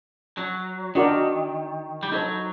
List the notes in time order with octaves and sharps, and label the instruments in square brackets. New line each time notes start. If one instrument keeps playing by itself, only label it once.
[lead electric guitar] F#3
[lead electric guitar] D#3 [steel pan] D4 F#4 A#4 D5
[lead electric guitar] G3
[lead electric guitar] F#3 [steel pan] D#4 A4 C5